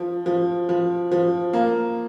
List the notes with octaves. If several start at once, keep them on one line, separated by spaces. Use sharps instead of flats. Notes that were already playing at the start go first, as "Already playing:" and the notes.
Already playing: F3
F3
F3
F3
A#3